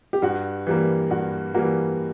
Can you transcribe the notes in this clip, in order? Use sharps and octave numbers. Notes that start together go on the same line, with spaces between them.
G4
G2 F#4
E3 G3 A#3
G2 F#4
E3 G3 A#3 F#4